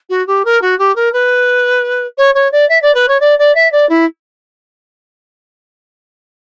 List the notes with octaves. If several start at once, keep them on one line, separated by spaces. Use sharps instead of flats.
F#4
G4
A#4
F#4
G4
A#4
B4
C#5
C#5
D5
E5
D5
B4
C#5
D5
D5
E5
D5
E4